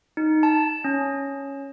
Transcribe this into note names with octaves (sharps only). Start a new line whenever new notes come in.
D#4
A5
C#4